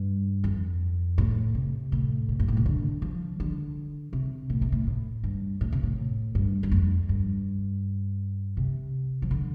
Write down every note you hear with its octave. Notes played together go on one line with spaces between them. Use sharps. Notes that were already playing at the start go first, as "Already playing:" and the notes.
Already playing: G2
F2
A2
C3
A2
C3
G2
A2
C3
D3
F3
D3
C3
A2
C3
A2
A2
G2
A2
C3
A2
G2
G2
F2
G2
C3
F3
D3